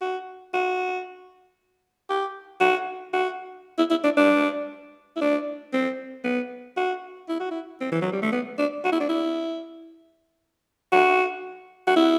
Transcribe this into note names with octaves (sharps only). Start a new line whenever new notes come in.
F#4
F#4
G4
F#4
F#4
E4
E4
D4
D4
E4
D4
C4
B3
F#4
E4
F#4
E4
C4
E3
F#3
G3
A3
B3
D4
F#4
E4
D4
E4
F#4
F#4
E4